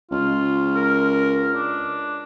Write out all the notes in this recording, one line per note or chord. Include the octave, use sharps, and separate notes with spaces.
C#2 F4
A#4
D4